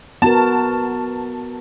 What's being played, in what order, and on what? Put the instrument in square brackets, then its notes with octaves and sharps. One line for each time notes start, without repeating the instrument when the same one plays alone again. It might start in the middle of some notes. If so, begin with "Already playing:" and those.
[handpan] B3 F#4 A#4 [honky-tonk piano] A5